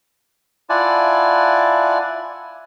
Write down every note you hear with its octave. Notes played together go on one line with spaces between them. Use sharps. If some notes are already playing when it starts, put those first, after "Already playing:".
E4 F4 D5 F#5 G#5 A5